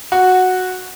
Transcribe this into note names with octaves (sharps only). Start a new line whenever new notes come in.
F#4